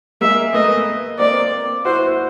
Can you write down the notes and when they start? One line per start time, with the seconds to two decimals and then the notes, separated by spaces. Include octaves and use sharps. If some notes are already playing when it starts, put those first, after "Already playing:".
0.21 G#3 A#3 E5
0.53 A3 B3 D#5
1.19 A#3 C4 D5
1.85 E4 F#4 C5